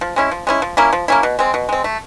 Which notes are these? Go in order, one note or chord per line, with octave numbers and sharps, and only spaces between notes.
F3
G#3 C#4 E4
F3
G#3 C#4 E4
F3
A#3 C#4 E4
F3
A#3 C#4 E4
B2
G#3 C4
B2
G#3 C4
A3